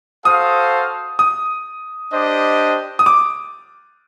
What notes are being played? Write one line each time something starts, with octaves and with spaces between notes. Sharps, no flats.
F#4 A4 C5 F5 D#6
D#6
D4 G4 C5 D#5
D#6
D6